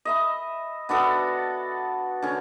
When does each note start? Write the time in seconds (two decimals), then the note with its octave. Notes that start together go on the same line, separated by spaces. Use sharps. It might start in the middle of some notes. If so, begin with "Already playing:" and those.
0.05 D#5 E5 B5
0.89 B3 D4 F#4 A4
2.22 D3 C#4